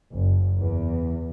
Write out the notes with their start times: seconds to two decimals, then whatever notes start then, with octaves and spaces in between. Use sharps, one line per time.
0.14 F#1
0.60 E2